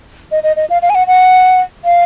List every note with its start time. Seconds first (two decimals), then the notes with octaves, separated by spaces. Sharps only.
0.32 D#5
0.43 D#5
0.56 D#5
0.70 F5
0.82 F5
0.90 G#5
0.95 F#5
1.07 F#5
1.85 F5